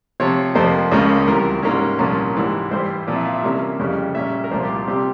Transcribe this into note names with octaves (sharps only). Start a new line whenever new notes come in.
C3 F3 C4 C#5
F2 C3 F3 A#3 C5
C#2 C#3 F3 A#3 C#4
C2 C3 E3 A#4
G#2 G3 A#3 C#4
C2 A#2 F3 A#3 C#4
G#2 E3 G3
G2 E3 G3 C5
A#2 F3 C4
E5
F5
E5
C3 E3 G3 A#3 C#4
F2 C#3 G3 C#4
A#2 G3 C#4 E5
A#4
C2 A#2 F3 C5
G4
F4
C3 G3 C4 G4